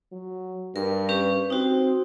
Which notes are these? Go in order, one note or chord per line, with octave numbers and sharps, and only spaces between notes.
F#3
G2 A#4
C#4 G4 B4
C4 D#4 F#4